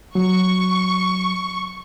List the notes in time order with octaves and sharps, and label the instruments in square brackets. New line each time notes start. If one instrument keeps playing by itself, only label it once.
[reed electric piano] F#3 [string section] C#6